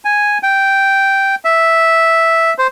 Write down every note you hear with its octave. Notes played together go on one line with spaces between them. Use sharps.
G#5
G5
E5
C5